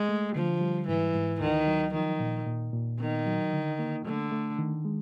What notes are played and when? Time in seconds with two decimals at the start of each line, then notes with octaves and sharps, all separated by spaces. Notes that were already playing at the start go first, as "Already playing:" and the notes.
Already playing: G#3
0.09 A3
0.36 D3 F3
0.61 G3
0.88 G#2 E3
1.14 G#2
1.40 D2 D#3
1.67 F#3
1.94 D#3 F3
2.20 A#2
2.47 A#2
2.73 A#2
3.00 D#3 B3
3.26 F#3
3.53 D3
3.79 A#3
4.06 D3 A3
4.32 A3
4.59 D#3
4.85 G#3